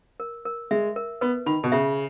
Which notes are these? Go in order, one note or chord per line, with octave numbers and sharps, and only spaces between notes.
A#4
A#4
G#3 E5
A#4
B3 B4
D#3 B5
B2
C#3 E5